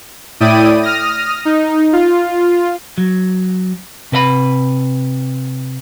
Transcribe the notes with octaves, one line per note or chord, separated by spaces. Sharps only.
A2 E4 D5 G5 D#6 D#7
D#6 F6 A#6
D#4
F4
F#3
C3 B4 D#5 B5